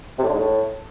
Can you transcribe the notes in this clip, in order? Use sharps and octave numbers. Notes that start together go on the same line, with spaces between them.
C3
A2
D3
G#2
A2